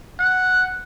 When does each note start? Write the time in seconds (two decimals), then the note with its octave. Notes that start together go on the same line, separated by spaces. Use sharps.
0.20 F#5